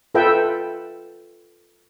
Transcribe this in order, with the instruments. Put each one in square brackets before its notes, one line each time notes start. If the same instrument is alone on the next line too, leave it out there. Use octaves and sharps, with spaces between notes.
[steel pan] F4 A4 B4 E5 G5